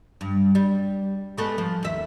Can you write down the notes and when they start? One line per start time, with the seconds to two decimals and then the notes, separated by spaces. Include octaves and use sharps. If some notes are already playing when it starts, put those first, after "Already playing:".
0.21 G2
0.55 G3
1.38 G#3 A3 B3
1.58 F3
1.83 D#2 E5